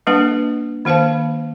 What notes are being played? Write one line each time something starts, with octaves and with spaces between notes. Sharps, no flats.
G3 A#3 D4 B4 F#5
D#3 A#3 C5 F5 A5